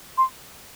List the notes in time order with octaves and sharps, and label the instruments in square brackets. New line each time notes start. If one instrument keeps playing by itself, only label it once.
[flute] C6